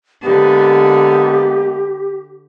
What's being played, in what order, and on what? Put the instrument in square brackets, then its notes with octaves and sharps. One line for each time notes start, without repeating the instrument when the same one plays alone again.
[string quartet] D3 [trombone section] G#3 A#3 B3 [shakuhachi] G4